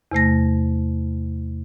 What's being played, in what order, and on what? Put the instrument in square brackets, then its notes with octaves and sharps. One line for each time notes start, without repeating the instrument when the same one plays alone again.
[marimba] E2 C3 A3 A#6